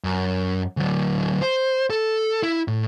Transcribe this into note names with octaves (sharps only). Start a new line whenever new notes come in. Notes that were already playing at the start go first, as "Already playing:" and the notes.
F#2
D2 F#3
C5
A4
E4
A2